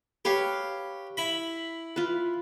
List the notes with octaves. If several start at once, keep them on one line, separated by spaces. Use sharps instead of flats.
G4 B4 C#5 F5
E4 B5
F4 B4